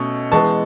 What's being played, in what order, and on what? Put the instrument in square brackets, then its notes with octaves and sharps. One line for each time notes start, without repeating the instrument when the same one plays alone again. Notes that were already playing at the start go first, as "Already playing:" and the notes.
Already playing: [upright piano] B2 A3 C#4 C#6
E3 G#3 B3 A5 C#6